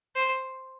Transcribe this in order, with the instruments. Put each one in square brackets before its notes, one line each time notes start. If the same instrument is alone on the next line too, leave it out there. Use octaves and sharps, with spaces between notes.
[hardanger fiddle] C5